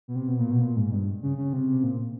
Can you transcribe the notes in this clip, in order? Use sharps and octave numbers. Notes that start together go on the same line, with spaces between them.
B2
C3
B2
A#2
B2
A#2
G#2
G2
C#3
C#3
C3
C3
A#2